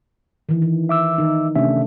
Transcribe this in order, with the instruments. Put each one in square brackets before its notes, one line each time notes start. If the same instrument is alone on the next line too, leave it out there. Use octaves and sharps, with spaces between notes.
[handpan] D#3 E3
E3
[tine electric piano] E5 D6 E6
[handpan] D#3 D#4
[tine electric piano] C3 C#4 E5 [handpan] A3 D4